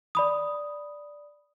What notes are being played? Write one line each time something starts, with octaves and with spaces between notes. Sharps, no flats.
D5 B5 D#6